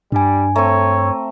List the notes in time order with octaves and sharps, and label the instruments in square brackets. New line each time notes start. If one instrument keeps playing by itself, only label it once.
[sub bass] G2 [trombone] G3 [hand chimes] D4 G#5
[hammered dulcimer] A3 C4 [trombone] C#5 [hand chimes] A#5